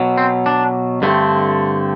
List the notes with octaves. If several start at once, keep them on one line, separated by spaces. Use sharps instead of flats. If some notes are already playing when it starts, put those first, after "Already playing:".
Already playing: B2 F#3
C4
D4
G2 D3 A3 C4